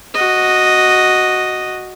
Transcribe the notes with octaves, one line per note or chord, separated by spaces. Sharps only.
F#4 D#5